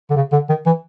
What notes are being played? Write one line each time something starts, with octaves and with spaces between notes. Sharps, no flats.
D3
C#3
D3
D#3
E3